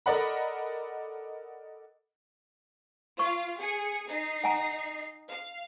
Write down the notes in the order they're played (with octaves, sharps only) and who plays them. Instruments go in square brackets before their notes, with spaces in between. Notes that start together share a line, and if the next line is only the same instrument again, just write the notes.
[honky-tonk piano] A4 A#4 D5 D#5 F#5 B5
[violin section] F4 F5 [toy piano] C#6
[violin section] G#4 G#5 C#7
D#4 C7
[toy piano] F#5 G#5 A#5
[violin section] F5